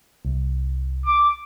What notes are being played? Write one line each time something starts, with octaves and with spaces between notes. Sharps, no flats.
C2
D6